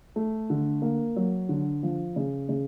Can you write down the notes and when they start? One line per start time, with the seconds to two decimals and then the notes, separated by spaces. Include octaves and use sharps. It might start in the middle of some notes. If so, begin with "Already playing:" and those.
0.16 A3
0.50 D3
0.82 A#3
1.16 F#3
1.49 D3
1.83 F3
2.16 C#3
2.49 C#3